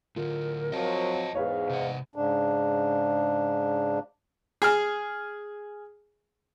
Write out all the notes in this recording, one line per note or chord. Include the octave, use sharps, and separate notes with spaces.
A2 D3 F4 A#4
F3 F#3 C4 D#5 F5 A5
E2 G#2 G#4 B4 C#5 F5
C3 F#5
G#2 C#3 D4
G#4 G#5 F6